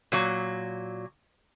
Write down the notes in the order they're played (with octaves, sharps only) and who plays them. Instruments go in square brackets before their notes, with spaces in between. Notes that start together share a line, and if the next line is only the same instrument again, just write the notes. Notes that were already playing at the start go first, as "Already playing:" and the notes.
[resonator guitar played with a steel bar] A#2 F#3